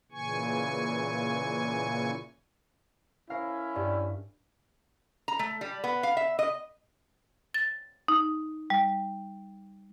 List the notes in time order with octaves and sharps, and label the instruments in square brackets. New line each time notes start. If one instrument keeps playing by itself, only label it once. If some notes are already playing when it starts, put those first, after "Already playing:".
[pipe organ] A#2 C#3 E3 G#5 C#6
[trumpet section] C#4 E4 [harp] A#4 F5
[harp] G2 [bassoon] G3
[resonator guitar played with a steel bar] A#5
A3
G3
B3
F5
E5
D#5
[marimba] A6
D#4
G3